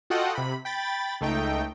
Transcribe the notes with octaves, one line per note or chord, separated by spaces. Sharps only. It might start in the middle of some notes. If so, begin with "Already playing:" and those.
F4 F#4 A4 D#5 F#5 G5
C3 B5
G5 B5 A6
C#2 A3 D#4 G5